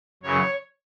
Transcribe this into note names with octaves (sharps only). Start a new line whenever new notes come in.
F#2 C#3 E3 C#5